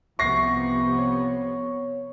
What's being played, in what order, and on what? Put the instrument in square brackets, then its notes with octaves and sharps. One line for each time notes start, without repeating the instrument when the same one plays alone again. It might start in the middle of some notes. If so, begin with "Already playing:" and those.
[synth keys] C2 E5 [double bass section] C3 F3 B3 [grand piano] C#6 A#6 C7
[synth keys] C#5